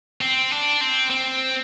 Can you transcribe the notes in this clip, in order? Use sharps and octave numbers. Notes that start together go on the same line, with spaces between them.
C4
D4
C4
C4